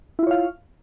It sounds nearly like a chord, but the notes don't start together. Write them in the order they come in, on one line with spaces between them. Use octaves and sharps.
E4 F4 C#5 F5